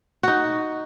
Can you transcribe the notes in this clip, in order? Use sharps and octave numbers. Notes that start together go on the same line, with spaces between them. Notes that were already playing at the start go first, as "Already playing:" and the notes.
D#4 F#4